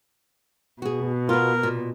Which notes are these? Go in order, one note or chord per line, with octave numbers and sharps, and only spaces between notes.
B2 F#4 G#4
B3 F4 A#4
A#2